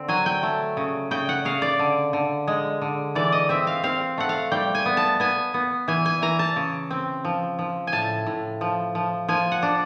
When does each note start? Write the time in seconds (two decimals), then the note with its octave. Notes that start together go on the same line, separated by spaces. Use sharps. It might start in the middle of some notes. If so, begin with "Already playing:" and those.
Already playing: D3 C4
0.08 F#3 G#5
0.26 G5
0.43 A3
0.77 C#3
1.11 C#3 G5
1.29 F#5
1.45 C#3 F5
1.62 D5
1.79 D3
2.13 D3
2.47 G#3
2.81 D3
3.15 E3 D5
3.32 D#5
3.49 C4 E5
3.67 F5
3.83 C4 F5
4.18 A3 F#5
4.29 F5
4.52 G3 G5
4.75 G#5
4.86 B3
4.97 A5
5.20 B3 G#5
5.54 B3
5.88 E3 G#5
6.05 G#5
6.22 E3 A#5
6.39 A5
6.56 C#3
6.90 C4
7.25 F3
7.59 F3
7.87 G#5
7.92 A2 A5
8.26 A2
8.61 F3
8.95 F3
9.28 F3 G#5
9.52 F#5
9.63 D4